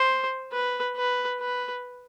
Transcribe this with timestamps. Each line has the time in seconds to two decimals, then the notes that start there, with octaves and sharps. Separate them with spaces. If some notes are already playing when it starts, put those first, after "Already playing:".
Already playing: C5
0.52 B4
0.97 B4
1.40 B4